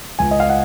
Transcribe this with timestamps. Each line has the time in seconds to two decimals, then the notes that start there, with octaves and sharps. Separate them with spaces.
0.19 C#2 G#5
0.31 D#5
0.40 F5
0.49 F#5